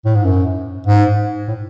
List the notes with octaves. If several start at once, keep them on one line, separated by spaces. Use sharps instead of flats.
A2
G#2
F#2
G#2
A2